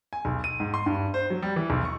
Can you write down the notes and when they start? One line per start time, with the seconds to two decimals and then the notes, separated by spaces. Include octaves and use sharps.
0.13 G#5
0.25 B1
0.44 D#7
0.60 G#2
0.74 C6
0.86 G2
1.14 C5
1.30 F#3
1.42 G3
1.56 E3
1.70 B1
1.85 C#6